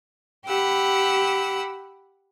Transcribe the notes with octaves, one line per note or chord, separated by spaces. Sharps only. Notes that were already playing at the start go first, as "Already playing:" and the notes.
G4 F#5 B5 E6